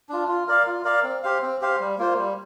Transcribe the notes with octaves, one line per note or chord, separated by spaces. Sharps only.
D4 F4
F4
A#4 D5 F5
F4
A#4 D5 F5
C4
G4 C5 F5
C4
G4 C5 F5
G3
A#3 F4 C5
G3